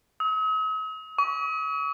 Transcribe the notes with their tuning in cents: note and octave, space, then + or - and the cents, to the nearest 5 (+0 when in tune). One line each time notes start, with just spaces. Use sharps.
D#6 +45
C#6 +40